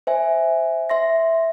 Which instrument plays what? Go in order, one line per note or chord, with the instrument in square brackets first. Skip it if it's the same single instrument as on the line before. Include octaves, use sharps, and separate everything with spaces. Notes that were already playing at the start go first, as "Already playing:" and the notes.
[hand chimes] C5 E5 G#5
E5 C6 A#6